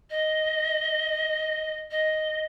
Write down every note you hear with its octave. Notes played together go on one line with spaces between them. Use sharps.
D#5
D#5